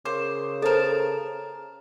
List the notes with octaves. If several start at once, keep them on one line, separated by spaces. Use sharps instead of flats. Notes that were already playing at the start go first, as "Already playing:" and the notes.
C#3 A#4 C5 D6
A4 A#4 C5 A5 E7